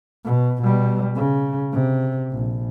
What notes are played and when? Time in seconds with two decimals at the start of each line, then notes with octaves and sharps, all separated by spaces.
0.25 B2
0.63 B2 G3
1.16 C#3
1.73 C3
2.32 A#1